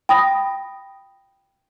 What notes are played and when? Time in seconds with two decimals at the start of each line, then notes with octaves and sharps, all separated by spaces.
0.09 G5 B5 D#6 A#6